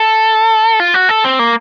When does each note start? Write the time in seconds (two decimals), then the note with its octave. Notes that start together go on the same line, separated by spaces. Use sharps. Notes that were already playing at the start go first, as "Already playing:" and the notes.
Already playing: A4
0.80 F4
0.94 F#4
1.09 A4
1.24 C4
1.39 A#3